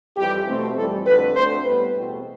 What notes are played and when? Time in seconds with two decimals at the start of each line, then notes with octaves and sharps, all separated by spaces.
0.16 F2 E3 G3 G4
0.47 B2 A3 C4
0.76 F2 E3 G3 A4
1.05 F2 D3 A3 C4 B4
1.35 D2 D3 A3 C4 C5
1.65 A2 G3 B3 B4
1.95 E2 B2 A3 C4